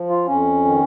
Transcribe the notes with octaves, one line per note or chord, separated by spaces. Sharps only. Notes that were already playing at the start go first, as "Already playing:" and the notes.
Already playing: F3
F4
F2 C#4
D#3